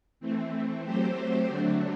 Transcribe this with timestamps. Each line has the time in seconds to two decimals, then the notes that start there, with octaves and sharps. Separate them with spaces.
0.20 E3 A3 C4
0.84 F#3 A3 C4 G4 C5
1.48 D3 F#3 A3 D4